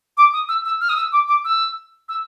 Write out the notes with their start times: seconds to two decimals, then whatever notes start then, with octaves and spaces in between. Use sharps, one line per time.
0.17 D6
0.33 D#6
0.49 E6
0.65 E6
0.81 F6
0.89 D#6
0.96 E6
1.12 D6
1.28 D6
1.45 E6
2.09 E6